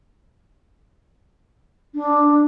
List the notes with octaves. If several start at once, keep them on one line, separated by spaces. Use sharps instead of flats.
D4